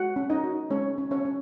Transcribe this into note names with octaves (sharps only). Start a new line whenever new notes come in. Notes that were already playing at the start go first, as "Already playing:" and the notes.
Already playing: G#3 F#4 F#5
C#4
D#4 D#5
F#4
G#3 C#4 C#5
C#4
C#4 C#5
C#4